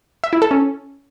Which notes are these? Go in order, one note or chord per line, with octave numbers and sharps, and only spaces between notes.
E5
E4
A4
C#4